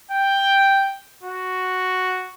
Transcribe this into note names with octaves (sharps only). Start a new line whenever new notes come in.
G5
F#4